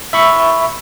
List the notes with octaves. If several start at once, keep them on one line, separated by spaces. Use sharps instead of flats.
E5 B5 C#6